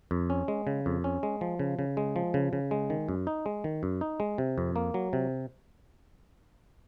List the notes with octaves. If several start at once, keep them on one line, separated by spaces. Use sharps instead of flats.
F2
C#4
G#3
C#3
F2
C#4
G#3
F3
C#3
C#3
G#3
F3
C#3
C#3
G#3
D#3
F#2
D#4
G#3
D#3
F#2
D#4
G#3
C3
F2
A#3
F#3
C3